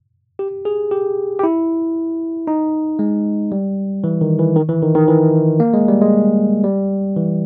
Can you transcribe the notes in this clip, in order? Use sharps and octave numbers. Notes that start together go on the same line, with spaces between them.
G4
G#4
G4
G4
E4
D#4
G#3
G3
E3
D#3
E3
D#3
E3
D#3
D#3
E3
A#3
G#3
G3
G#3
G3
E3